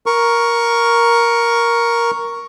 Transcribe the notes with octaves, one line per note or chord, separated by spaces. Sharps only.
A#4 C#6